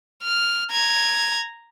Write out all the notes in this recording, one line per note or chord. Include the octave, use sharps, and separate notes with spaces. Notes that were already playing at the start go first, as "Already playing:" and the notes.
F6
A#5 G#6